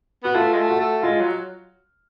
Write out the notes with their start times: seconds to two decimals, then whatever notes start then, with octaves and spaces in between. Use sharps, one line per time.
0.24 B3 F#4
0.35 A3 F4
0.53 G#3
0.58 A3
0.69 F#4
0.80 A3
1.03 G#3 F4
1.20 F#3